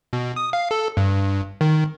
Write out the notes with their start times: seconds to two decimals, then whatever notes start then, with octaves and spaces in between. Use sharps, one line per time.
0.13 B2
0.36 D#6
0.53 F5
0.71 A4
0.97 G2
1.61 D#3